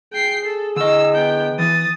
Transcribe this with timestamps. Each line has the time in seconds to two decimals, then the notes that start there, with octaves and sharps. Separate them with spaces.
0.13 G#4 G5 C7
0.45 A4
0.76 D3 D#5 E6
1.15 B3 G5
1.59 E3 D#6 A6